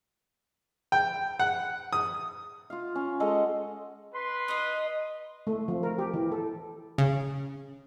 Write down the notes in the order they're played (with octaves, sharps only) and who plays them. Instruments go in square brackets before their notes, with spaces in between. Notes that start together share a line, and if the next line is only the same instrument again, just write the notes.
[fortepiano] G5
F#5
D#6
[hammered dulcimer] F4 F5
C#4
G#3 A4 D#5 F#5
[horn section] B4 C6
[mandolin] D#4 D#5
[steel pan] A3
F3
A#4
G4
E3
A4
[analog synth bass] C#3